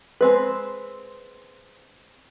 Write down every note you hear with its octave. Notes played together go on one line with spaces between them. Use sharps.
G#3 C4 B4